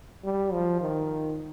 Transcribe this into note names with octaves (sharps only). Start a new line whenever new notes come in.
G3
F3
D#3